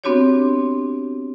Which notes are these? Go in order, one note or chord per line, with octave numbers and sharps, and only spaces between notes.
B3 C4 D4 F#4 G4 C#5